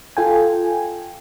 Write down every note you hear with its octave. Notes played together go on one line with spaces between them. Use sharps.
F4 A4 G5 G#5